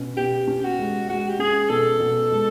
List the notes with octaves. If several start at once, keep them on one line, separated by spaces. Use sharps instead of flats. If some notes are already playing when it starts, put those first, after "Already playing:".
Already playing: B2 C#4
B2 G4
C#4
F#4
G#3
G#3 F#4
G4
C#4 G#4
B2 A4
B2
G#3